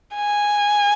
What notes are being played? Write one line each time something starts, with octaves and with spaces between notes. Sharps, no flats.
G#5